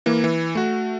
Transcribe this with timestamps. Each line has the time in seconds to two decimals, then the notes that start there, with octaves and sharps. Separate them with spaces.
0.06 E3 A#3
0.24 E3
0.55 A3 F#4